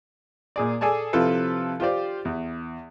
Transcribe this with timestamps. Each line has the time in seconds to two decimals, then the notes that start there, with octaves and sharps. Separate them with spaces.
0.56 A#2 G#4 D5
0.81 G#4 A4 D5 G#5 A5
1.13 C3 F3 E4 F4 A4 B4
1.80 F4 G4 C5 D5
2.25 E2